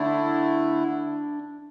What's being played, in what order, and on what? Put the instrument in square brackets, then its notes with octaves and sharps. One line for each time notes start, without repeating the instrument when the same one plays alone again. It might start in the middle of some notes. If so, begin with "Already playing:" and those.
Already playing: [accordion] D3 A3 E4 [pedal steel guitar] D4